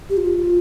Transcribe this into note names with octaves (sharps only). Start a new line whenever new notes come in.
G4
F4